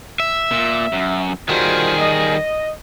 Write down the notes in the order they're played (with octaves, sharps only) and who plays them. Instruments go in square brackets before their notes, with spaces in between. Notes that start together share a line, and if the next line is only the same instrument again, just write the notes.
[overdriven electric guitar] E5
[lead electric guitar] A#2
F#2
[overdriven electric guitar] D#3 G3 [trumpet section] F4 F#4 C5 [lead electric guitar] G#4
[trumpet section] D#5